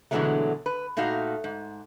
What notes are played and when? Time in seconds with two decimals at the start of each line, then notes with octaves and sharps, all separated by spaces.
0.11 B2 D3 E3 F#3 G#3 A3
0.66 B4
0.97 A#2 A3 D#4 F#4 F5
1.44 G#2